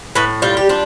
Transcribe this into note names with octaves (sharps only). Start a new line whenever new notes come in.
A2 B4
G3 F4
G4
D4 F4